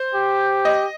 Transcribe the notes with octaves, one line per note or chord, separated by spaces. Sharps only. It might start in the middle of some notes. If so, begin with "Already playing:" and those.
Already playing: C5
G4
D#5